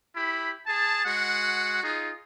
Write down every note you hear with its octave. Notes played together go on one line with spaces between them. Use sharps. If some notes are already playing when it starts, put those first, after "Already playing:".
E4 G4 B5
G#4 A5
G#3 F#4 F#5
D#4 F4 G#4